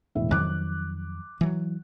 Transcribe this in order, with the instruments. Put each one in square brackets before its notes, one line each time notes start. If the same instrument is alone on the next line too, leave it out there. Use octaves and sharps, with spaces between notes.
[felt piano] E1 A2 E5
[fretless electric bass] F2 D#3 F#3 [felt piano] D6 F#6
[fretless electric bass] E3 F#3